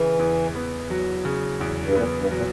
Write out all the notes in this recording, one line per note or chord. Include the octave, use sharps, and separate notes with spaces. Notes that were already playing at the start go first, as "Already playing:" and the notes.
Already playing: C#3 E3
E2
B3
F#3
C#3
E2
G2
A#2 B3
G2
A#2 F#3